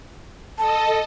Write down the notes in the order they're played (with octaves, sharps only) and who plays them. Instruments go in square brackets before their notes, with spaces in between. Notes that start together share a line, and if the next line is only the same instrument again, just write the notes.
[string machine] A4 D#5 [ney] A5